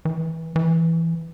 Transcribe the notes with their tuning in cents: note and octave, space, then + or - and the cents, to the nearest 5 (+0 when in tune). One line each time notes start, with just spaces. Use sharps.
E3 -20
E3 +5